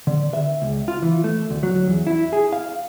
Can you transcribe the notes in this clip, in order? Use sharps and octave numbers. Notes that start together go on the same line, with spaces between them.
D3
E5
C#2
F4
E3
A3
D2
F#3
E2
E4
G#4
F5